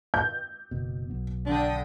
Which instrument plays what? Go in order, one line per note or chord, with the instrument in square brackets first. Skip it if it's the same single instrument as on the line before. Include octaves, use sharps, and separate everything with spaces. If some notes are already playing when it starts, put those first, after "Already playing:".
[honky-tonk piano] G6
[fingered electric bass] F#1 B2
B1 B3
[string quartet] D3 G5 D#6 [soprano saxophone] D4